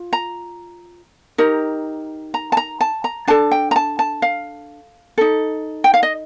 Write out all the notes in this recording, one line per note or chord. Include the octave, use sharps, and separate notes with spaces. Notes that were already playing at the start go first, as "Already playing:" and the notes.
Already playing: F4
A#5
D#4 G4 A#4
A#5
A5
A#5
A5
A#5
D4 A4 A5
G5
A#5
A5
A5
F5
D#4 A4
G5
F5
D#5